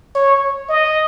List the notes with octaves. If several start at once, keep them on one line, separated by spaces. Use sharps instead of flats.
C#5
D#5